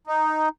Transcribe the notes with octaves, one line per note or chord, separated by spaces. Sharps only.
D#4